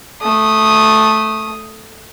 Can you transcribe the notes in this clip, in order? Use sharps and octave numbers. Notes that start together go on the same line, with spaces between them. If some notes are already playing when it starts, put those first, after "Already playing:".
A3 D#6